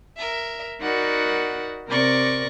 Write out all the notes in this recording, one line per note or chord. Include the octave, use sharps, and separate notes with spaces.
A#4 E5
D#4 F#4 A#4 D5 F#5 B5
C3 A#4 D5 C#6 A#6